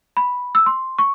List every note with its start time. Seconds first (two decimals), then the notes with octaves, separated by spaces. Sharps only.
0.17 B5
0.55 E6
0.66 C6
0.99 C#6